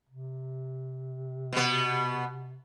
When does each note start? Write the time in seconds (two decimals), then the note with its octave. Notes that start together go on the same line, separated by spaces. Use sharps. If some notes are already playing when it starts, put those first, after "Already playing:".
0.09 C3
1.53 B2 B3